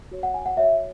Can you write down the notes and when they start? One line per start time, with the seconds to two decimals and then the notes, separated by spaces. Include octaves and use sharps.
0.11 F#4 C#5
0.23 F#5
0.34 G#5
0.46 F#5
0.57 F#4 C#5 E5